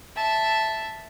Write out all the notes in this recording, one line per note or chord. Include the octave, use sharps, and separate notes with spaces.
E5 A5